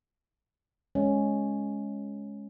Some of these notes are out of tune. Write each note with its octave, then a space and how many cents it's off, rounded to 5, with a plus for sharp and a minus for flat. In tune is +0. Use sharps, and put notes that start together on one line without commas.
G#3 +5 C#4 +0